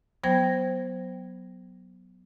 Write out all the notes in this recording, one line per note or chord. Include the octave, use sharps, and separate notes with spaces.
F#3 B3 C5 G5 G#6 A#6